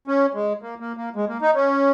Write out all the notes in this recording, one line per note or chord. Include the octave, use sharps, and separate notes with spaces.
C#4
G#3
A#3
A#3
A#3
G#3
A#3
D#4
C#4